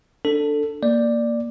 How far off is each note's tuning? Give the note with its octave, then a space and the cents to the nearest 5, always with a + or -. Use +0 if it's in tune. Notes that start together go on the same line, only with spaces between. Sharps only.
D4 +0 A4 +15
A#3 +0 D5 +5